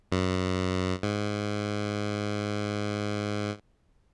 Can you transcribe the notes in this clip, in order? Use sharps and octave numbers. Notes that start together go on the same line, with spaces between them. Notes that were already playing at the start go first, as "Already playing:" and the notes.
F#2
G#2